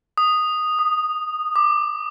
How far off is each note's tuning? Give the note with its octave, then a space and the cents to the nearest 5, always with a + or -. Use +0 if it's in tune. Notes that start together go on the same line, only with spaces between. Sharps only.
D#6 -5
D#6 -30
D6 +20